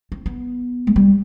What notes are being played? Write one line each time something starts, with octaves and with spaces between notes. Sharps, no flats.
C4
B3
G#3
G3